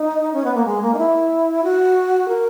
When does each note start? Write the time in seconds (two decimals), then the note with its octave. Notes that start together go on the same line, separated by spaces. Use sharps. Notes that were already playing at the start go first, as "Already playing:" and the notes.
Already playing: D#4
0.33 C#4
0.44 B3
0.54 A#3
0.65 G#3
0.82 A#3
0.94 D#4
0.98 E4
1.64 F#4
2.28 A#4